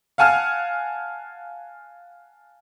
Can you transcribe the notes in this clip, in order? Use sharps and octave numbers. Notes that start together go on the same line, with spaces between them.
F5 F#5 G#5 A5 F6